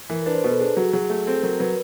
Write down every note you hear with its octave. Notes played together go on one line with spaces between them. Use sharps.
E3 A#4
A#4
D4 B4
C5
B2 B4
A4
D4 G#4
F#3 F#4
F#3 G#4
A3 G#4
C4 A4
F#3 A#4
F#3 B4